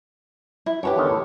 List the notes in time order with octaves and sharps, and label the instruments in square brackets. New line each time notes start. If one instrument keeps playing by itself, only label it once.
[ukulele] E4
[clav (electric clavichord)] F#2 [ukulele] G4 B4 C#5
[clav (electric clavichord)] E2 D3 D#3
A2